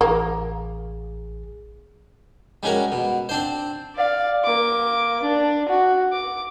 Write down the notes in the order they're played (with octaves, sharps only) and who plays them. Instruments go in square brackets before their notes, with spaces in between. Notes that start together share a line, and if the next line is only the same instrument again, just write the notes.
[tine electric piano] A1 G#4 [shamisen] A#3
[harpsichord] G3 G#3 C#4 F#4 A#4
B2
C4 D4 C5
[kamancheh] D5 F5
A#3 D6
D4
F#4
D6